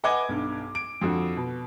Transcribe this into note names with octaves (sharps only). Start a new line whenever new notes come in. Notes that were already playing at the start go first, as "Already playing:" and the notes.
B4 D#5 F#5 G#5 D6 G#6
B1 G2
D7
F2 D3 F#4
B2